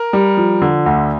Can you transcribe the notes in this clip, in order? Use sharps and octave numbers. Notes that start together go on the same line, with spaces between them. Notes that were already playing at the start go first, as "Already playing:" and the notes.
Already playing: A#4
G3
F3
D3
D2